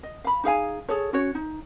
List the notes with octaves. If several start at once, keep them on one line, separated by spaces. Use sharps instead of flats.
D#5
F5 B5
D#4 G#4 F5 G#5
G#4 A4 C#5
C#4 F#4 C#5
D#4